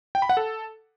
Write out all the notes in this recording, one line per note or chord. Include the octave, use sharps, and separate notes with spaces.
G5
B5
F#5
A4